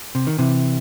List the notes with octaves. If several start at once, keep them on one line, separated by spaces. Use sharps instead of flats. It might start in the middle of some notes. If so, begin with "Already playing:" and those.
C3
D#3
C3 E3